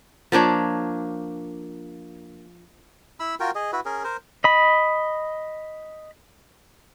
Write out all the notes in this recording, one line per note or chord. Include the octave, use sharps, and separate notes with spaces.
F3 A#3 D4 C#5
E4 B5 E6
F4 F#4 A#4 G5
G#4 D#5
E4 F#4 B4
C#4 G#4 A#4
A#4 C5
D#5 B5